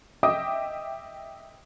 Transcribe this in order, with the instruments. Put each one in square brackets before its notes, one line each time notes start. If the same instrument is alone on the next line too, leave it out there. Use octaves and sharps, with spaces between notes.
[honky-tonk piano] D#5 E5 G5 D6 D#6